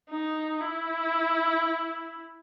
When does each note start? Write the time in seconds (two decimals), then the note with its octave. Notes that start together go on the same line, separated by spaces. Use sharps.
0.11 D#4
0.60 E4